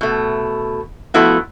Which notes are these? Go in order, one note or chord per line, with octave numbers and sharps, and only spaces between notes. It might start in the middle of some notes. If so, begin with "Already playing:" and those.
B2 A3
F3 A3 B3 E4 F#4